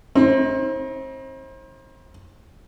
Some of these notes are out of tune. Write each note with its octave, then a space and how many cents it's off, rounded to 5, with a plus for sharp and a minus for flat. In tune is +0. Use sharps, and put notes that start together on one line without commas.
C4 +35 D#4 +45